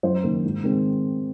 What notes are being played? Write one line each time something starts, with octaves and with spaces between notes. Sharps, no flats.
F#2 C5
D#3 A#3
G#2
D#3 G#3 C4